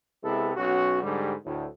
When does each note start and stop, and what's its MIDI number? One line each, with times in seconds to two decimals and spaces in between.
0.23 0.51 48
0.23 0.51 56
0.23 0.51 59
0.23 0.51 64
0.23 0.51 69
0.56 0.98 35
0.56 0.98 61
0.56 0.98 66
1.02 1.32 44
1.02 1.32 50
1.02 1.32 55
1.45 1.65 38
1.45 1.65 45